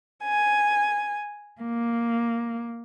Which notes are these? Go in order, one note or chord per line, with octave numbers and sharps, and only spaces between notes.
G#5
A#3